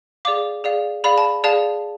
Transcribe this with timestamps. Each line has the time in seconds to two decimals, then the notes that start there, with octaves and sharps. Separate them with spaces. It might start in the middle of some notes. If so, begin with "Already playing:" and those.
0.25 G#4 D5 F5 D6
0.64 G#4 D5 F5
1.04 G#4 D5 F5 B5
1.18 A5
1.44 G#4 D5 F5 A5